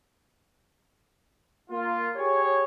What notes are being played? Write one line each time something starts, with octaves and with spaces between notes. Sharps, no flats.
A#3 F4
G4 G#4 C#5